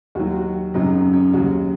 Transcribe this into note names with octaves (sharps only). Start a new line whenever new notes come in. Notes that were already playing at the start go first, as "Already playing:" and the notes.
D#2 D#3 F#3 F#4
F#4
G#1 F#2 C#3 F#3 D#4
C#4
C#4
D#2 C#3 F#3 F#4